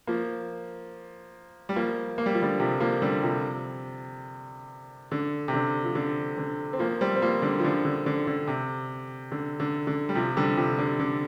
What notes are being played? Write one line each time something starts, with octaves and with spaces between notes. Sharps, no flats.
F3 A#3
G3
F3 A#3
A#3
G3
F3
D3 G3
C3 F3
F3 A#3
D3 G3
C3 F3
D3
C3
D3
F3
D3
D3
C4
F3 A#3
G3 C4
C4
F3 A#3
D3 G3
F3
D3
D3
D3
D3
C3
D3
D3
D3
G3
C3 F3
D3 G3
C3 F3
D3
D3